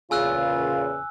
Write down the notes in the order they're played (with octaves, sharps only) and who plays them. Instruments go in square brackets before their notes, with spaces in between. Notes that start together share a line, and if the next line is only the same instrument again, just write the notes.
[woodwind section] E2 A#2 C#3 [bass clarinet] F4 [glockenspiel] G#5 E6 F#6